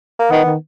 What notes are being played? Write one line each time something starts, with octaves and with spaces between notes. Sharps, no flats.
A#3
D#3 B3
D#3